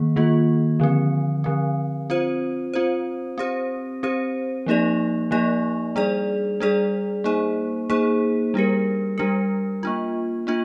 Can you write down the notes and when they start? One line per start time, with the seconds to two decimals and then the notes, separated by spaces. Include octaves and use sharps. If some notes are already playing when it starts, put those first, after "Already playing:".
Already playing: D#3 A#3
0.16 D#3 A#3 F4
0.80 D3 F3 C4
1.44 D3 F3 C4
2.10 C4 F4 C5
2.74 C4 F4 C5
3.38 C4 G4 C5
4.03 C4 G4 C5
4.66 F3 A#3 D#4 G4 D5
5.31 F3 A#3 D#4 G4 D5
5.96 G3 D4 G#4 D5
6.60 G3 D4 G#4 D5
7.24 A#3 D#4 G#4 C5
7.90 A#3 D#4 G#4 C5
8.54 G3 D4 G4 A#4
9.18 G3 D4 G4 A#4
9.83 A#3 D4 F4
10.47 A#3 D4 F4